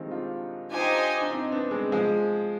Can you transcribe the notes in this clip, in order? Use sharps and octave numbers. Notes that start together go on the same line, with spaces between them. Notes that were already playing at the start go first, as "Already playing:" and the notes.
Already playing: D#3 F3 G3 G#3 C4 D#4
D4 F4
D4 D#4 F4 G4 C5 D#5 G#5
D4
C4 D#4
B3 D4
G#3 C4
F3 G#3